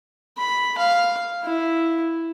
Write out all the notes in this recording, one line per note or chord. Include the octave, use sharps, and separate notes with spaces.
B5
F5
E4